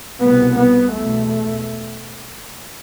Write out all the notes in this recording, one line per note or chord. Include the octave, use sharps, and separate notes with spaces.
C2 B2 B3
B3
E2 B2 A3